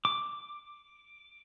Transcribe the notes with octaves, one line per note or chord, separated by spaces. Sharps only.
D6